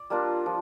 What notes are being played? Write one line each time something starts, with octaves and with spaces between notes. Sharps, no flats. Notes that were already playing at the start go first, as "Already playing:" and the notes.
Already playing: D5
G3 A#3 D4 F4
F3